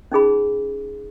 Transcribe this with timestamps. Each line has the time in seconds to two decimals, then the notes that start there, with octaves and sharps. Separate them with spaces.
0.12 C#4 D#4 G#4 B5